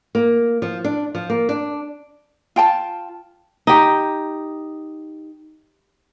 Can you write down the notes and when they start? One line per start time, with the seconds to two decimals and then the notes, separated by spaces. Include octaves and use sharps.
0.15 A#3
0.62 F3
0.84 D4
1.15 F3
1.30 A#3
1.49 D4
2.56 F4 G5 A5
3.67 D#4 G4